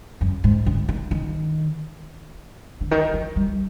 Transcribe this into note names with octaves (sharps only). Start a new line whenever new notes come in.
F#2
G#2
D3
D#3
D#3
D3
D#3
F3
G3